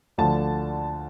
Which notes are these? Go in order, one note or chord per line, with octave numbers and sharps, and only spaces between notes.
D2 D3 F3 A5